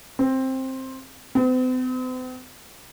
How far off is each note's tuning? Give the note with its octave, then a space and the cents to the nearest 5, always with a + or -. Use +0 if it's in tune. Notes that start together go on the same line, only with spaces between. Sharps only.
C4 +10
C4 -45